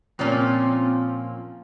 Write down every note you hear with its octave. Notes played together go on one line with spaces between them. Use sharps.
A#2 F3 A#3 C4 C#4